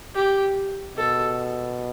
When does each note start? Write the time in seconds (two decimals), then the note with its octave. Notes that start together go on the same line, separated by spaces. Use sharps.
0.15 G4
0.97 B2 A4